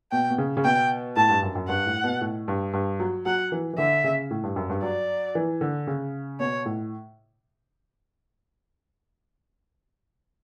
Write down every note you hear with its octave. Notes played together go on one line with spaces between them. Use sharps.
B2 G5
B2
C#3
C#3
B2 G5
A2 A5
G2
F#2
F#2
G2 F#5
A2
B2
A2
G2
G2
F#3
F#3 F#5
E3
E3
D3 E5
C#3
A2
G2
F#2
G2
F#3 D5
E3
D3
C#3
B2 C#5
A2